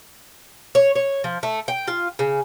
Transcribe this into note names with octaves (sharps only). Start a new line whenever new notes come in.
C#5
C#5
F3
A3
G5
F4
C#3